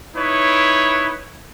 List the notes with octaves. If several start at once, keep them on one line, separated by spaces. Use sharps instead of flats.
D#4 E4 B4 C#5